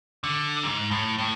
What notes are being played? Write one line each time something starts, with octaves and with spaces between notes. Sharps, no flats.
D3
G#2
A2
A2